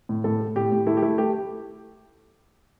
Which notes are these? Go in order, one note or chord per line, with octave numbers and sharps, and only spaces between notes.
A2
A2 A4
A3
A2 G4
A2
A3 E4
G4
A3 E4
A3 G4